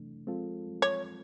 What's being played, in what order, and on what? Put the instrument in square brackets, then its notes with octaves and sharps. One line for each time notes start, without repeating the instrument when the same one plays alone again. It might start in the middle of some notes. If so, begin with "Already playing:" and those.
Already playing: [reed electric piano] C3 E3 A3 D4
F3 G#3 C4 F4 A4
[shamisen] C#5